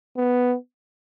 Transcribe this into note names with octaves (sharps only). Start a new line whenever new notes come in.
B3